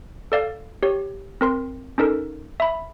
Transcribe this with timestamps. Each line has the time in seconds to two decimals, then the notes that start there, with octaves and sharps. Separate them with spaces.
0.32 A4 D5 F5
0.83 G4 C#5
1.41 C4 A#4 C6
1.98 C#4 D#4 A4 A#4
2.60 E5 B5